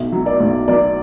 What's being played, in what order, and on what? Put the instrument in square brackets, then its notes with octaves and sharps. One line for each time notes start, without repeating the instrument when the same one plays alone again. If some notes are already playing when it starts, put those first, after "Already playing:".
Already playing: [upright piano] B1 E5
F#3
D5
B1
F#3 D5